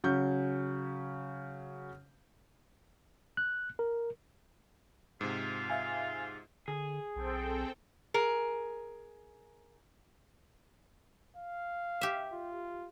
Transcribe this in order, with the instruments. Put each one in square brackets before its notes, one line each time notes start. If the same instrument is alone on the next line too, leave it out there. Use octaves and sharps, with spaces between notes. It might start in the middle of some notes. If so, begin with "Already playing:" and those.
[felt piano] C#3 F#3 C#4 C#6 G6
[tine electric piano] F#6
A#4
[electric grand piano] G#2 C3 [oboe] F4
[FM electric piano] E5 F5 G#5
[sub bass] D3 [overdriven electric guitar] G#4
[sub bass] B1 [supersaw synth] C4 A4 G5
[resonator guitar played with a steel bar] G#4 A#4
[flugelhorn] F5
[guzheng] G4 E5
[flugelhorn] F4